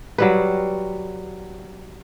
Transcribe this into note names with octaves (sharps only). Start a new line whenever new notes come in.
F#3 G3 B4